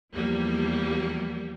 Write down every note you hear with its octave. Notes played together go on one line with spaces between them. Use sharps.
E2 F3 G3 A#3